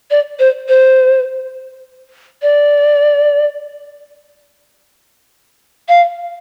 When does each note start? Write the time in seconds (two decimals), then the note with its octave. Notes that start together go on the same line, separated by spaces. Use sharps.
0.11 D5
0.39 C5
0.69 C5
2.42 D5
5.89 F5